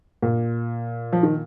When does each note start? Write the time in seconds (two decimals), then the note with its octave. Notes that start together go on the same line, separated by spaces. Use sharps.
0.22 A#2
1.13 F3
1.23 D#3